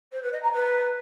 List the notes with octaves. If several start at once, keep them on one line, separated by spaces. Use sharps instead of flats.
C5
B4
D#5
A#5
B4